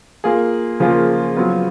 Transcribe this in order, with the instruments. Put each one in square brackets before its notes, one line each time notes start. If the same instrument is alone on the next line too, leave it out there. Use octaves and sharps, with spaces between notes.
[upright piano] A#3 F4 G#4
[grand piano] C#3 F3 [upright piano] A#3 F4 G#4
[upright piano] F#3 B3 F4